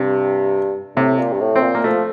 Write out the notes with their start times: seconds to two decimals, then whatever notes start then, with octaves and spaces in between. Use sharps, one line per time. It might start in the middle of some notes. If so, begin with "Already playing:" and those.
Already playing: G2 C3
0.96 A2 C3
1.19 A#2
1.33 G2
1.41 A2
1.56 C4
1.63 A#2
1.75 A#3
1.84 F3 A3